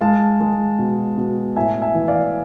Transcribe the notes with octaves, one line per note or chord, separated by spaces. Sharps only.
G#3 F5 A5
G#3
B2
B2
A2 E5 G#5
E5 G#5
E3
D5 F5